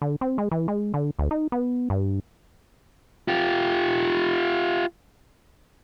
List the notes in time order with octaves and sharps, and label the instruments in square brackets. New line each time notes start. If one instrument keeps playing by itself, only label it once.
[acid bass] D3
C4
G#3
E3
G#3
D3
D2
D#4
B3
G2
[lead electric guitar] F4 G4